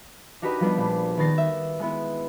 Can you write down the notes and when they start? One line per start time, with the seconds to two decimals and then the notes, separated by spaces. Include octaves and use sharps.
0.42 D4 D#4 F#4 G4 B4 D#5
0.60 F3 G3 B3 D4
0.77 A#1
1.18 D#3 B3 D#4 A6 A#6 C7
1.38 E5
1.79 G#3 B3 E4